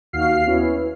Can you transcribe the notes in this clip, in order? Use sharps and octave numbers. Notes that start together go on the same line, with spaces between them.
D#2 F#4 F5 F6 C7
B3 C#4 E4